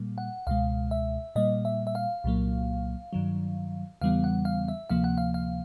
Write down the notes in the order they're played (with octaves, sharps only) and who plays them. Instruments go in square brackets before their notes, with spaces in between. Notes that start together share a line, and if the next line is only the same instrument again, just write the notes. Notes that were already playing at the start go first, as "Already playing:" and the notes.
Already playing: [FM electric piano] A#2 G3 A#3
F#5
C#2 B2 G#3 F5
E5
A#2 G3 A#3 D#5
E5
E5
F5
C2 A#2 F#3 A#3
G2 D#3 F#3
E2 C#3 E3 G3 B3 F5
F#5
F5
E5
D2 C3 F3 A#3 F5
F#5
F5
F5